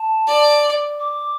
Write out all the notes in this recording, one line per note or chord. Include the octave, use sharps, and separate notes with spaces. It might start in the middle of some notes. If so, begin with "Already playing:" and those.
Already playing: A5
D5
D6